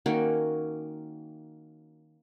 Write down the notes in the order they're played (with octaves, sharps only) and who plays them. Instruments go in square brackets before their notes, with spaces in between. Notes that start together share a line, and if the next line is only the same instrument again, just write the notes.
[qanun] D#3 A#3 C#4 F#4